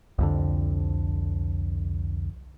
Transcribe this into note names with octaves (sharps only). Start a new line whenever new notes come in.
C2 F2 D3